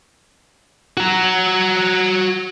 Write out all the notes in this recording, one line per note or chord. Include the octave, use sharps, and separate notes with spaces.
F#4 A#5